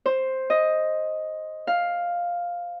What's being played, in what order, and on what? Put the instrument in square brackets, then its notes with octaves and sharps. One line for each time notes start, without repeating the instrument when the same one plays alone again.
[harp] C5
D#5
F5